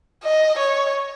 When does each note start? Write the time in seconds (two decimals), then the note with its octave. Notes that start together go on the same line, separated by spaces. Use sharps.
0.24 D#5
0.58 C#5